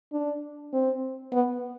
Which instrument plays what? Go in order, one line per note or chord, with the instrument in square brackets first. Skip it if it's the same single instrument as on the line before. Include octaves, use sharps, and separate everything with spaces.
[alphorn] D4
C4
B3